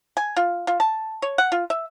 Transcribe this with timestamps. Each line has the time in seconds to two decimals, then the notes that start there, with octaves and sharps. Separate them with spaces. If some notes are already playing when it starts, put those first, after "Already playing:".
0.17 G#5
0.36 F4
0.67 F4
0.80 A5
1.22 C#5
1.38 F#5
1.52 F4
1.70 E5